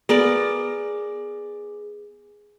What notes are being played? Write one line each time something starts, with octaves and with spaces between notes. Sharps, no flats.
B3 G#4 A#4 D5